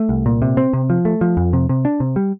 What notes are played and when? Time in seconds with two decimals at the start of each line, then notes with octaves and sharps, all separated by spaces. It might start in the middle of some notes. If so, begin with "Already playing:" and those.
Already playing: A3
0.09 C2
0.26 A#2
0.42 C3
0.57 C4
0.73 C3
0.90 F3
1.05 A3
1.21 F3
1.37 F2
1.53 C3
1.69 C3
1.85 D4
2.00 C3
2.16 G3